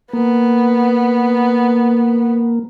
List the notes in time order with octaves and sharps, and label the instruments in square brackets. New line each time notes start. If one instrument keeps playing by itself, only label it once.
[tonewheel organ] A#3 [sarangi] B3